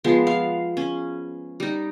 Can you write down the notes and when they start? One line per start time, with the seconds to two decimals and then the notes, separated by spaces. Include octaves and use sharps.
0.04 F3 G#3 B3
0.27 F5
0.77 C#4
1.60 G3 D#4